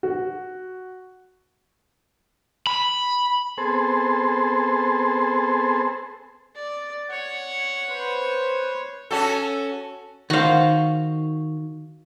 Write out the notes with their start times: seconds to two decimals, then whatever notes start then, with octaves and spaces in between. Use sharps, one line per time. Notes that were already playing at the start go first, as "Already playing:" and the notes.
0.03 F#4
2.67 B5
3.58 B3 C4 G#4 A4 C5
6.55 D5
7.11 C#5 F#5
7.89 B4 C5
9.11 C#4 F#4 A4
10.30 D#3 F#4 C5 F5